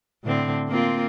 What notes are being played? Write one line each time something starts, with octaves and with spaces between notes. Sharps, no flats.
A2 D3 C4
A#3 C4 F4